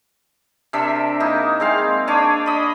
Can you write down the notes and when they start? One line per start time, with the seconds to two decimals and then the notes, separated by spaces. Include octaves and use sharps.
0.73 C3 D4 A#4 E5
1.20 A#3 D#4 E4
1.60 G#3 C4 F5
2.07 D4 C#5 G#5 D6
2.46 D#5 B5